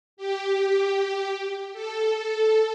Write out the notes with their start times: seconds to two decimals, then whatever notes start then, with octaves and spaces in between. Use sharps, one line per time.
0.17 G4
1.73 A4